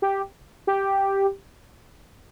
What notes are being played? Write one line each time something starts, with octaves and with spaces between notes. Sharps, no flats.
G4
G4